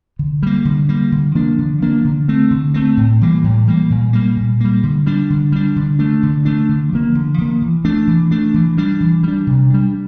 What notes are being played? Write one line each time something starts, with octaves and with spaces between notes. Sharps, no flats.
D3
G3 A#3
D3
G3 A#3
D3
F3 A#3 D4
D3
F3 A#3 D4
D3
A3 C4
D3
A3 C4
A2
E3 G3 A#3
A2
E3 G3 A#3
A#2
G3 A#3
A#2
G3 A#3
D3
G3 D4
D3
G3 D4
D3
A3 D4
D3
A3 D4
D3
F3 A#3
D3
F3 A#3
E3
A3 D4
E3
A3 D4
E3
G3 D4
E3
G3 D4
C3
G3 D4